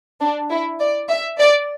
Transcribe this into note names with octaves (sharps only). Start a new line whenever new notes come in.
D4
E4
D5
E5
D5